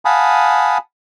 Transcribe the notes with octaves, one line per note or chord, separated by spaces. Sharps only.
F5 F#5 G#5 A5 B5 D#6